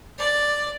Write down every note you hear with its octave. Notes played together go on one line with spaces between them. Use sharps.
D5